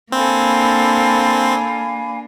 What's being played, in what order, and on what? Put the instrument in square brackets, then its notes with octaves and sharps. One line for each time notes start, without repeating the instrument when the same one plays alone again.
[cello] A#3 D4 [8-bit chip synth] C4 [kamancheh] A4 A#4 [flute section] F5 G#5 B5